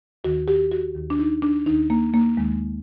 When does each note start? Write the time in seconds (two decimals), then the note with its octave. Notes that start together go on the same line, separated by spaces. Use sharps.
0.24 D#2 D#3 F#4
0.48 G4
0.71 F#4
0.95 D#2 D#3
1.10 D4
1.19 D#4
1.42 D4
1.66 D#2 D#3 D#4
1.90 A#3
2.14 A#3
2.37 D#2 D#3 G#3